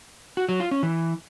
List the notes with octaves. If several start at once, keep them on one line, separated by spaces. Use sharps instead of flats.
F#4
F#3
F4
C#4
E3